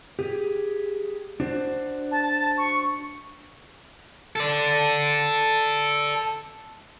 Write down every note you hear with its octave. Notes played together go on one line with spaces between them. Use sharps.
G4 G#4
D4 F#4 C5
A5
C#6
A4 D5